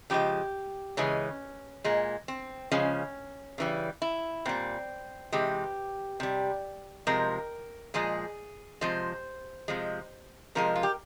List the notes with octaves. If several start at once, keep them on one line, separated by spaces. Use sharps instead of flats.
C#3 F3 G#3 G4
C#3 E3 G#3 C#4
A#2 G#3
C4
C#3 F3 G#3 C#4
C#3 E3 G3
E4
A#2 G3 C4
C3 E3 G#3 G4
C3 G3
C3 F3 G#3 A#4
A#2 F3 G#3 G#4
C3 F3 G#3 C5
C3 F3 G#3
C3 F3 G#3 A#4
F4
G4